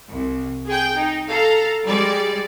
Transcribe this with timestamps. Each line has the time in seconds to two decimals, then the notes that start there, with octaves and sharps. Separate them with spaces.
0.10 C2
0.66 G#4 G5
0.96 D#4
1.28 A4 F5 A#5
1.87 G3 G#3 D5